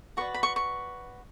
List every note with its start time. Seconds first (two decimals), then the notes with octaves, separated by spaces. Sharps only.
0.17 F#4 B4 D5 C#6
0.34 B5
0.43 C#6
0.56 C#6